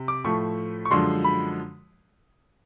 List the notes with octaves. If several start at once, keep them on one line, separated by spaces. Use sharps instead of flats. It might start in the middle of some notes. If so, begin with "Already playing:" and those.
Already playing: C3
D6
A2 F3 A3 C#6
C#6
F#2 D3 F3 G#3 C6
B5